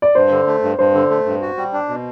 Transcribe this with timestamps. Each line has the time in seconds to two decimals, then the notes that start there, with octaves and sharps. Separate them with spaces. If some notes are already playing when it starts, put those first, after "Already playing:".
0.02 D5
0.15 G2 C5
0.31 D3
0.47 A3
0.63 G2
0.78 G2 C5
0.94 D3
1.10 A3
1.26 G2
1.42 F#4
1.57 G3
1.73 D4
1.89 B2